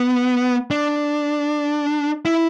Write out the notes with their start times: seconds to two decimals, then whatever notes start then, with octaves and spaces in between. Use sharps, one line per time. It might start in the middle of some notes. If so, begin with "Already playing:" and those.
Already playing: B3
0.70 D4
2.25 E4